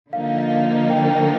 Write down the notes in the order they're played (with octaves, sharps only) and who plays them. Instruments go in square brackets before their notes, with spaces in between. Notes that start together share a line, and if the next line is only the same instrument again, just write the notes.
[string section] D3 F3 A#3 D#4 [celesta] F5
[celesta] F5
D#5
G5
G5